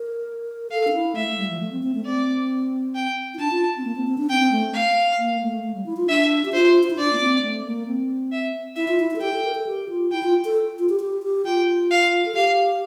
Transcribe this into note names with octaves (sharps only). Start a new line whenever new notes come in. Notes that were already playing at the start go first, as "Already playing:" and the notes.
Already playing: A#4
A4 F5
D4
E4
A3 E5
A3
G3
F3
A3
C4
C4
A3
C4 D5
G5
E4
D4 A5
F4
C4
A#3
C4
C4
D4
C4 G5
C4
A3
F5
A#3
A3
A3
G3
E4
F4
D4 E5
G4
F4 C5
F4
E4
D4 D5
A#3
C4
A3
A#3
C4
E5
E4 E5
F4
E4
E4
A4
G4 G5
A4
A#4
A4
G4
F4
E4 G5
F4
A4
F4
G4
G4
G4
F4 G5
F5
A4
G4 F5